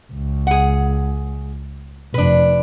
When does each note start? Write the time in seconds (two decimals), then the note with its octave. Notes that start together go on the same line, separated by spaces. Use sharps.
0.13 C#2
0.47 G#4 F#5
2.14 F1 D4 B4